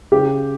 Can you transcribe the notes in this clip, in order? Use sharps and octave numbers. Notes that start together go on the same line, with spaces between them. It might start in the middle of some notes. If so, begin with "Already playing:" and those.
C#3 G4